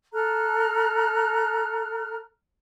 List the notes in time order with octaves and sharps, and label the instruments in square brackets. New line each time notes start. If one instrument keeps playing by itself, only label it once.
[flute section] A4 A#5 F6 F#6